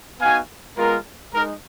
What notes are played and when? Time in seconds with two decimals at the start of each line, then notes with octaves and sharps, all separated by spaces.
0.20 B3 D#4 F#4 F5 G#5
0.77 G#3 B3 F4 A#4
1.33 G#3 D#4 A#4